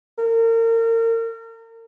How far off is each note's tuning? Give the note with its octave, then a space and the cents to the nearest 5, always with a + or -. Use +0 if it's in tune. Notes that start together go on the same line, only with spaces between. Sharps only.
A#4 -35